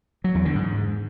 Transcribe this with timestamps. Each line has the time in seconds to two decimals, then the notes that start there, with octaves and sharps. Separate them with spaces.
0.24 F#3
0.35 E2
0.45 D3
0.56 G#2